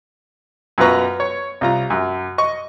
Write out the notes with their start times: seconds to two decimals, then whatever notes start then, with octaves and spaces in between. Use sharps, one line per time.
0.78 F#2 B2 F4 B4 A#5 C#6
1.20 C#5
1.61 C2 F4 A#5
1.90 F#2
2.38 D#5 C#6